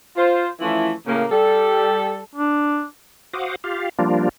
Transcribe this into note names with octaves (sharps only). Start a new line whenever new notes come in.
F4 C5
E3 F3 A3 C#4 E4
A2 C#3 A#3
G3 A4
D4
F#4 C5 F5 F#5 D6 D#6
F4 G4 F5
F3 G3 A#3 D4 F4